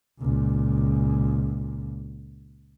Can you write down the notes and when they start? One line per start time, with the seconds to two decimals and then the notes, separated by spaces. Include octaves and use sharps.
0.20 C#2 A#2